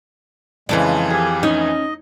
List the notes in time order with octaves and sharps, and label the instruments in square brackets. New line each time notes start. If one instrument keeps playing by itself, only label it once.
[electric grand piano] F2 E3 [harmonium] C#3 G#3 [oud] F3 A4 D5
[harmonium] G4 F5 [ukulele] G#4
[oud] C#4 [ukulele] D#4
[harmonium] D#5